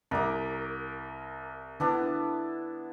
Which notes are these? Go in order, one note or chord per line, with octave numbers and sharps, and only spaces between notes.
C2 A#4 D6
D3 B3 D4 E4